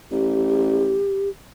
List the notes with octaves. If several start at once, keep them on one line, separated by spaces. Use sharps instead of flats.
A1 G4